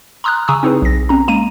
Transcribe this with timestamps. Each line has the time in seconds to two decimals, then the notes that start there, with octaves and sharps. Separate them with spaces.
0.24 A#5 C6 D#6 F6 F#6
0.48 C#3 G#5 A#5 C#6 D#6 E6
0.63 C4 D#4 E4 G#4 B4
0.82 B1 A#6
1.09 C4 C#4 A#5
1.28 G#3 A#3 A#5 D#7